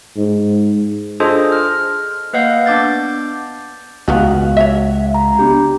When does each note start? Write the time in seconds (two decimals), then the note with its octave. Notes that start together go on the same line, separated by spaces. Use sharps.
0.17 G#2
1.20 D4 F4 G#4 A4 C5 D#5
1.52 F6
2.33 A#3 B4 D#5 F5 F#5 G6
2.66 B3 D4 D6 G6 A6
4.08 C#2 D#3 E3 B3 F#4 F5 F#5
4.57 C#5 E5
5.14 A#5
5.39 B3 D4 G4